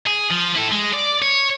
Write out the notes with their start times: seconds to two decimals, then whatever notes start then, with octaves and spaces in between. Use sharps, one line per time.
0.07 G#4
0.30 F3
0.55 E4 A4
0.71 G#3
0.93 D5
1.22 C#5